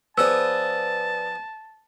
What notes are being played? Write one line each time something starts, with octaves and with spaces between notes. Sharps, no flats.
F3 B3 G#4 B4 D5 A5 E6